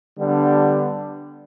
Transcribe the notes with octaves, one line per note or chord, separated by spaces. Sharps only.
D3 G3 B3 D4